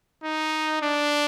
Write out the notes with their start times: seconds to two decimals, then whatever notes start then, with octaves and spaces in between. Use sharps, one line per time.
0.23 D#4
0.82 D4